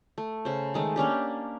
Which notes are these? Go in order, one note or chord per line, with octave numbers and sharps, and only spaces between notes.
A3
C#3 C5
D#3 G#3 A3
A#3 C#4 D4 G4